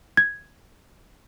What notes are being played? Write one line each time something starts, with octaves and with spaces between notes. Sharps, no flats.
G#6